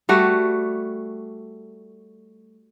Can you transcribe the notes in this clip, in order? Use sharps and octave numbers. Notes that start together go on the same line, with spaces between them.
G3 A3 F#4